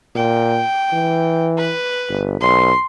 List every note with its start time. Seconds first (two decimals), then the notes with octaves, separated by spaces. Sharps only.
0.15 A#2 G5
0.93 E3
1.58 B4
2.09 G1
2.41 B1 C6